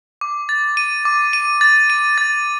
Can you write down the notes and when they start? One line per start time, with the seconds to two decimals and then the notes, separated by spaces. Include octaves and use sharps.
0.21 D6
0.49 A6
0.77 D#7
1.05 D6
1.33 D#7
1.61 A6
1.90 D#7
2.18 A6